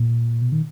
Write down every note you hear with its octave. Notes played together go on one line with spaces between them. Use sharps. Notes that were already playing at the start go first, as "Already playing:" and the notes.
Already playing: A#2
B2
D#3